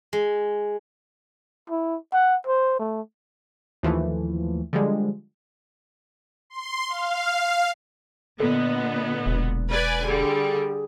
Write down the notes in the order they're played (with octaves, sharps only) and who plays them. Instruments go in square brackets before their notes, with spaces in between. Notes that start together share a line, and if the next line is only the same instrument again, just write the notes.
[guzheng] G#3
[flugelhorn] E4
F#5
C5
A3
[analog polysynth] D#2 E3 F3 A3
D3 F3 G3 G#3
[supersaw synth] C6
F5
[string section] A#2 D3 B3 [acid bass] A4 [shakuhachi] D#5
[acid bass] E1
[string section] B4 D5 G#5
[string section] D3 G3 [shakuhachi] G#4